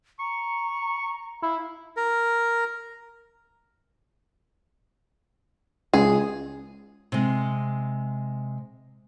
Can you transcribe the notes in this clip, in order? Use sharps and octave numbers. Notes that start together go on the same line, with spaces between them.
A#5 C#6
E4 F5
A#4
C#2 G#4
C3 G#3